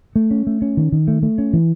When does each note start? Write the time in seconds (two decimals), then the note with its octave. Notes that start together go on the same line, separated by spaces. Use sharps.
0.16 A3
0.31 C#4
0.47 A3
0.62 C#4
0.77 D#3
0.92 D#3
1.08 A3
1.23 A3
1.38 C#4
1.53 E3